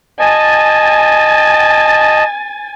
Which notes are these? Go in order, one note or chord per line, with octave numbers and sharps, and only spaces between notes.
D#5 G#5 A5 A6